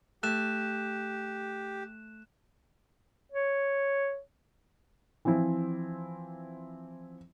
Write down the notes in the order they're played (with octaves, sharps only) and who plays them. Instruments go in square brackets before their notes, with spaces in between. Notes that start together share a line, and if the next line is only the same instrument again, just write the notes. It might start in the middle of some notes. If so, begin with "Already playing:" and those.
[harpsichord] A3 [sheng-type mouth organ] G4 [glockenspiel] F#6 E7
[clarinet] C#5
[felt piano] E3 F3 C4 E4